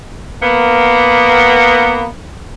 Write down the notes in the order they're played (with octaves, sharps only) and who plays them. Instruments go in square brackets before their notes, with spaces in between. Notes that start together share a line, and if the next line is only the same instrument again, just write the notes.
[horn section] A#3 B3